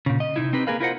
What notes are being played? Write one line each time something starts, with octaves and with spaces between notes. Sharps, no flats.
A#2 C#3
D#5
C3 D#4 E4
C4 D#4 G4 B4
A#3 G#4 A#4 B4 F5
E4 F4 A#4 C5 D#5 F#5